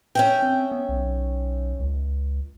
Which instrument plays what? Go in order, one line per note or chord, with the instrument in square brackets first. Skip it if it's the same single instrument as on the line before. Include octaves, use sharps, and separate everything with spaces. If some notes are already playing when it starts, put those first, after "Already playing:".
[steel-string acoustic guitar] C#4 E5 G5
[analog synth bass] C4
B3
B1
C#2